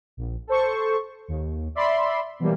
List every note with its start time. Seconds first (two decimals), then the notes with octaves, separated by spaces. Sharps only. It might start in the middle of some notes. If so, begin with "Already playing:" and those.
0.17 A#1
0.47 A4 C5 C#6
1.28 D#2
1.75 D5 E5 B5 C6
2.39 B2 E3 F#3 G3 A#3